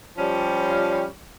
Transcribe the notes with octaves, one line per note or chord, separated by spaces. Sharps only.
F3 G3 C#4